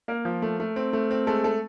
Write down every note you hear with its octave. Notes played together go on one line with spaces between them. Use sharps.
A#3 A#4
F3
A3
A3
C4
A3
C4
G#3 A3 A4
A3 A4